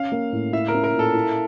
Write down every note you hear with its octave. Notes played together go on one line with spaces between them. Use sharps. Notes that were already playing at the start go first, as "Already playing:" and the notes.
Already playing: C#4 F5
A#3
A2
E4 E5
A#4
C#4
A#4
A#2
A4
E4